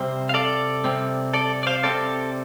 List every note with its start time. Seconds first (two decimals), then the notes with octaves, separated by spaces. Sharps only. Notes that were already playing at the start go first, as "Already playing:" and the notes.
Already playing: C3 G3 C4 C5
0.29 F5
0.34 A4 D5
0.84 C3 G3 C4
1.34 A4 D5
1.63 D5
1.67 C5 F5
1.83 C3 G3 C4 A4 D5